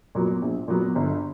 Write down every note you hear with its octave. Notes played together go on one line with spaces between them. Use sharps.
A#2 F#3 B3
A#1
A#2 F#3 B3
G1